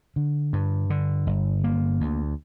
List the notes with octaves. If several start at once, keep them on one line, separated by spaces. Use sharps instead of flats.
D3
G2
D3
G1
A#3
D2